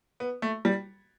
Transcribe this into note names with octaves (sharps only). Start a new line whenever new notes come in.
B3
A3
G3